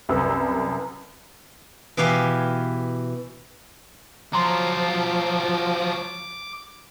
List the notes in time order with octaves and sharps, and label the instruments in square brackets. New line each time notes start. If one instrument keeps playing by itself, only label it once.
[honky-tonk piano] C2 F#2 B4 E6
[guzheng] B2 E3 G4 F5 G#5
[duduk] F3 [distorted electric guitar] F#3 F4 [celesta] A#5 C6 [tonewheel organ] D6